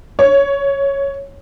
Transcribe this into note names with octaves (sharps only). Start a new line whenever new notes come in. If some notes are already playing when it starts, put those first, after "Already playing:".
C#5